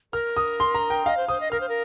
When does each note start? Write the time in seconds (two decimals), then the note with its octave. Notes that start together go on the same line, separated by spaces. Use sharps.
0.13 A#4 F6
0.37 D#6
0.60 C6
0.75 A#5
0.90 G5
1.05 D#5 F5
1.17 C5
1.28 C5 D#6
1.40 D#5
1.51 A#4 F6
1.61 C5
1.69 A#4